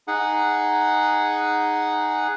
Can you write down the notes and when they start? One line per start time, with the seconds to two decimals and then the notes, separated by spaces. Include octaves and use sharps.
0.08 D#4 G#4 F#5